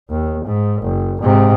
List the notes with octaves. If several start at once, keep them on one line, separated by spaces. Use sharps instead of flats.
D#2
G#2
F#1
G#2 C3